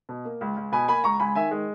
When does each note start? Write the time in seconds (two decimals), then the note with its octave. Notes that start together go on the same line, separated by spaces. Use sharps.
0.09 B2
0.25 A#3
0.41 C#2
0.57 C#2
0.72 B2 G#5 B5
0.88 A#3 G#5 B5
1.04 C#2 A#5 C#6
1.20 C#2 G#5 B5
1.35 D#3 E5 G#5
1.51 G#3